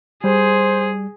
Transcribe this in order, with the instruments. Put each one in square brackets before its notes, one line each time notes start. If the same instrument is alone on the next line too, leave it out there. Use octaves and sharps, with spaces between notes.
[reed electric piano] G3 [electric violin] G#4 [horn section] C5